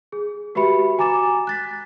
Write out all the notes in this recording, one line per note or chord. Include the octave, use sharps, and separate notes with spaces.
G#4
F#4 G4 B4 E5 B5 C#7
F#4 G#5 A#5 D6 A6 E7
F#6 A6 B6